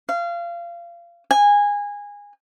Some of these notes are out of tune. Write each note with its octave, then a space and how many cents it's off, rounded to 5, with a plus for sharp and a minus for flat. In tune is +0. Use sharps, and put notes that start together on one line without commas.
F5 -25
G#5 -20